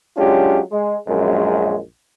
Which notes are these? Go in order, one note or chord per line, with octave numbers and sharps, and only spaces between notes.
F#3 G#3 C#4 D4 F4 G4
G#3
A#1 F#2 G#3